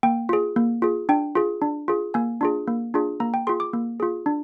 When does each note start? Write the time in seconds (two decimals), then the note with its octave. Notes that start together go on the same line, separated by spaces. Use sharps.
0.03 A#3 G5
0.29 F4 G#4
0.56 A#3
0.82 F4 G#4
1.09 D4 G5
1.35 F4 G#4
1.62 D4
1.88 F4 G#4
2.14 A#3 G#5
2.41 D4 F4 G#4
2.67 A#3
2.94 D4 F4 G#4
3.20 A#3 A#5
3.34 G5
3.47 F4 G#4 C6
3.60 D6
3.73 A#3
4.00 F4 G#4
4.26 D4